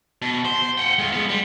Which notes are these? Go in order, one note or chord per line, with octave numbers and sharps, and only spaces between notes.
B2
C5
F#5 G5
G#3 F4
G#3 B3
G3